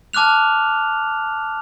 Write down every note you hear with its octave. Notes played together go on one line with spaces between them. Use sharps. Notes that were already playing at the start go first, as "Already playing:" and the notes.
A5 D6 F6 F#6 F7